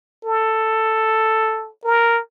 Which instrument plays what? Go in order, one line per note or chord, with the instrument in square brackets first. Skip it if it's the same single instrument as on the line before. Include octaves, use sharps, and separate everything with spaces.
[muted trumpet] A4
A#4